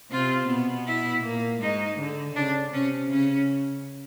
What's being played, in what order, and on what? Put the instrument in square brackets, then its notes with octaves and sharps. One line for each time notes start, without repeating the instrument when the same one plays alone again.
[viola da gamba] C3 C4 [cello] F4
[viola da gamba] B2 B3
[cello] E4
[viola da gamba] A#2 A#3
[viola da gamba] G#2 G#3 [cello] D#4
[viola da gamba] D3
[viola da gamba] C#3 [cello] D4
[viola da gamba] C3 [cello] C#4
[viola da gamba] C#3 [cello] C#4